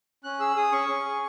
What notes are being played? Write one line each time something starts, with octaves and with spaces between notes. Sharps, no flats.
C#4 F#6
G#4 E6
G#4 D#6
C#4 C#6
C#4
G#4